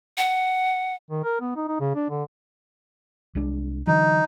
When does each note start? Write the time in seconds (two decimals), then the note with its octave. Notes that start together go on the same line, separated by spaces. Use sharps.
0.18 F#5
1.10 D#3
1.24 A#4
1.41 B3
1.56 D#4
1.68 D#4
1.80 C#3
1.95 D4
2.10 D3
3.35 C2 G#3 D4
3.87 D3 E3 F#3 D#4